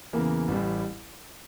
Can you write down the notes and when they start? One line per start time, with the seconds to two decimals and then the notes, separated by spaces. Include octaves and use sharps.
0.13 E2 C#3 E3 A#3
0.48 A1 A2 G3